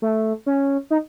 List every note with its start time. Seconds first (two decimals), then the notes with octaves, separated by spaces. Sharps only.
0.02 A3
0.46 C#4
0.91 D#4